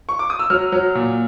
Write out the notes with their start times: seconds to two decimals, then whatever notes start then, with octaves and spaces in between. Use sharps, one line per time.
0.09 C#6
0.19 D6
0.30 D#6
0.39 E6
0.50 F#3 F6
0.72 F#3
0.95 A#2